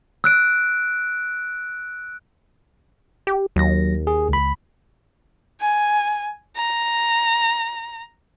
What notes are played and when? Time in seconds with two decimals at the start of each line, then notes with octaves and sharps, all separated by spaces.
0.24 E6 F#6 D7
3.27 G4
3.56 D#2 F#3 A#6
4.07 G#4
4.29 C#2 B5
5.61 G#5
6.56 A#5